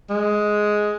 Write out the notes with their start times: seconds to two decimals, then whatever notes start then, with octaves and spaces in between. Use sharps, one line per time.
0.10 G#3